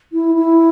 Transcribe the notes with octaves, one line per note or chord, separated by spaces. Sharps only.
E4
E4